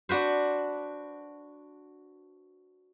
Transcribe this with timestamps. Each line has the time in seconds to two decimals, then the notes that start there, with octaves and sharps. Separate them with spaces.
0.09 D4 F#4 B4 C5